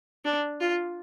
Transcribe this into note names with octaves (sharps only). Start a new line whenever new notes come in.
D4
F4